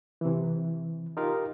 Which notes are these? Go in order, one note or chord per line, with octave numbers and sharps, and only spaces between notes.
C3 E3
D#4 F4 G4 A#4 F5